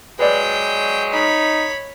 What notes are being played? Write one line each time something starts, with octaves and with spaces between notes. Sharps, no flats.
F#3 G#3 B4 D5 G5
D#4 C#5 B5